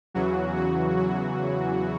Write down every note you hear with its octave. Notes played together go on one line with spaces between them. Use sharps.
E2 C#3 E3 F#3 F#4
F#3 F#4
F#3 F#4